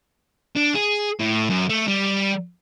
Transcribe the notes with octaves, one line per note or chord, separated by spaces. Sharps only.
D4
G#4
A2
F#2
A3
G3